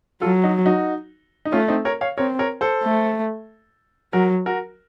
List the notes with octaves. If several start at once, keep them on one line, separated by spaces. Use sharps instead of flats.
F#3 F4 A4
D#4 F#4
D#4 F#4
D#4
A3 C#4 F4
C4 D#4
A#4 C#5
C#5 F5
C4 A#4 C#5
A#4 C#5
A4 C5
A3
F#3 F#4 A#4
F#4 A#4